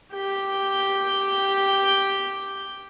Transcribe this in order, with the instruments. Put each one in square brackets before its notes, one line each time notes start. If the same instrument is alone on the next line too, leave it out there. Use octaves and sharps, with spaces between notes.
[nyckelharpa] G4 G5